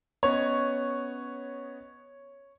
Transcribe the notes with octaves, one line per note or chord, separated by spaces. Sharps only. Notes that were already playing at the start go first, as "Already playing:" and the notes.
B3 C#4 C#5 D#5